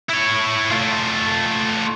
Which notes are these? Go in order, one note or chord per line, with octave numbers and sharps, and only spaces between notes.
E4 C#5
A3 F4